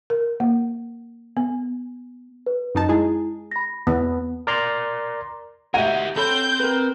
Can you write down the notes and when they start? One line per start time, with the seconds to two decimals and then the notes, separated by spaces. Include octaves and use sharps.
0.10 A#4
0.40 A#3
1.37 B3
2.46 B4
2.75 F#2 D#4 A5
2.89 G#3 E4 G#4
3.51 B5 A#6
3.87 E2 B3
4.47 A#4 D5 A#5 C6
5.74 F#4 G4 A#4 D#5 E5 F#5 G#6 D#7
6.17 C4 A4 C#5 B5 C6 G6
6.59 A#4 B4